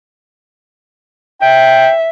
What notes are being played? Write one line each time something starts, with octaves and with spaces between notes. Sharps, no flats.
E5 G5